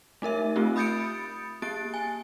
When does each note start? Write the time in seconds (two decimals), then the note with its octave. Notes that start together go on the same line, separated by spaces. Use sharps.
0.22 A3 D#4 A#4 E5
0.56 A3 C4 F4 G4
0.76 B5 D#6 G6 A6 C#7 D7
1.62 A#3 G4 A6 D7
1.94 G#5